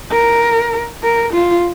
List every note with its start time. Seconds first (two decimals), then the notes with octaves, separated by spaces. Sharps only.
0.12 A#4
1.03 A#4
1.33 F4